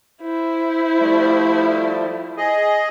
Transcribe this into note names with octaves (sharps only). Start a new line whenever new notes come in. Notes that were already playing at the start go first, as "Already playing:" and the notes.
E4 C5
F3 G3 A3
G#4 D#5